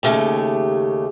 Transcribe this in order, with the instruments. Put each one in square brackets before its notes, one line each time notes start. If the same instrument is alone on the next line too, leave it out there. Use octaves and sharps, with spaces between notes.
[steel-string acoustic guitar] D#2 A#2 C#3 A3 G4